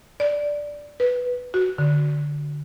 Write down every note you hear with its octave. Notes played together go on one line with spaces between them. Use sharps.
D5
B4
F#4
D3